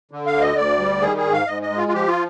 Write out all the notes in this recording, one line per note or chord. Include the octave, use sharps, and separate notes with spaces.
D3
F5
D2
D#5
D2 D5
G3
D#3 G#4
G#4
G#2
F5
G#2 D#5
D#5
G#3
F4
F4
F3 G4
F4